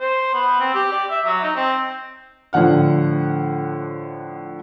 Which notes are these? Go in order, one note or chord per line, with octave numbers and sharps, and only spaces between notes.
C5
B3
C4
G4
D5
E5
F#3
D#4
C4
A2 D3 F3 F#5 F6